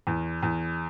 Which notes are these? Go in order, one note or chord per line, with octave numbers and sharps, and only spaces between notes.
E2
E2